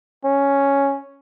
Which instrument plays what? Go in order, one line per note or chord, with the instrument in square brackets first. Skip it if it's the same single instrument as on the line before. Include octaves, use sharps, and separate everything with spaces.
[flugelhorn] C#4